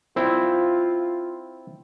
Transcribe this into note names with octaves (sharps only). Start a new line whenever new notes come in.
C4 E4 F4